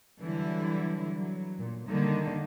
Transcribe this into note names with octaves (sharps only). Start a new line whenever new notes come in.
D3 E3 F#3 G3 E4
F#3
A#2
D3 D#3 G3 A#3